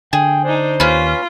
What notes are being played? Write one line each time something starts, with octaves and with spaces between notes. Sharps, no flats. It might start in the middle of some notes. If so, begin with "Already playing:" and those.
D3 G#4 G5
D4 D#4 C5
D#2 C#4 F4 B4